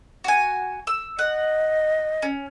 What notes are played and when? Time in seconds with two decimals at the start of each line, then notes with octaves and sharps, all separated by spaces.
0.24 F#4 G#5
0.87 E6
1.19 D#5 F#5
2.22 C#4